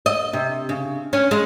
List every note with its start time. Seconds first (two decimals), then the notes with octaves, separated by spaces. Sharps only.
0.06 D#5
0.33 C3
0.69 C#3
1.13 C#4
1.31 G#3